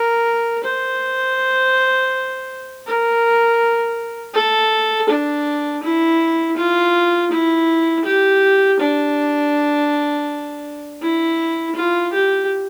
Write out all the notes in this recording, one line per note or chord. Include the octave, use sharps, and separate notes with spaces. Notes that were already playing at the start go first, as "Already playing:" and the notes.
Already playing: A#4
C5
A#4
A4
D4
E4
F4
E4
G4
D4
E4
F4
G4